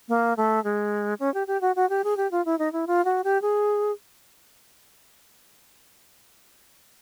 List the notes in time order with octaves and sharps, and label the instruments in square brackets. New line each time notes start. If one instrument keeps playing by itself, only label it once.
[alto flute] A#3
A3
G#3
C#4
G4
G4
F#4
F#4
G4
G#4
G4
F4
E4
D#4
E4
F4
F#4
G4
G#4